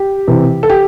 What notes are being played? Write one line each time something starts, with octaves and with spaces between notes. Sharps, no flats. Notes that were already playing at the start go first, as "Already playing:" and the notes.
Already playing: G4
C3 E3
A4
G4